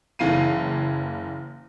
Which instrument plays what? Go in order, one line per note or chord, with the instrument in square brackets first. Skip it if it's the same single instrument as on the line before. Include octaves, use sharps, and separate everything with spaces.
[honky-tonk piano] F#1 E3 F5 C7 D#7